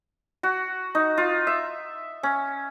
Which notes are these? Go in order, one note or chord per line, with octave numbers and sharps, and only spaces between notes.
F#4
D#4
F4
E5
C#4